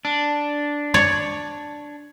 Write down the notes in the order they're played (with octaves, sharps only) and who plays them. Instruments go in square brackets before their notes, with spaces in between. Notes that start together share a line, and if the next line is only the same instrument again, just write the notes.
[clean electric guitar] D4
[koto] C#5 D5